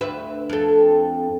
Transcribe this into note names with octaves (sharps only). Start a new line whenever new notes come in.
D2 B4 E5
F2 A4